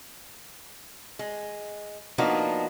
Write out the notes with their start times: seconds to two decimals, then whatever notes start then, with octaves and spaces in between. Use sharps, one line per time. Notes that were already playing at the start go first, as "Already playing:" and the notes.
1.19 G#3
2.18 F3 A#3 B3 D4 D#4 F#4